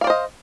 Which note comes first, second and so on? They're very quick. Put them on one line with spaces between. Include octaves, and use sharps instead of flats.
F5 D5 C5 D#5